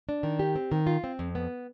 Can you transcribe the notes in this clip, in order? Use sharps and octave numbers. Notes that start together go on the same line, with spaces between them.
D4
D#3
G4
C4
D#3
F4
C4
F2
B3